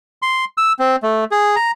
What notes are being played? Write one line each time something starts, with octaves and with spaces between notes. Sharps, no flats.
C6
E6
C4
A3
G#4
A#5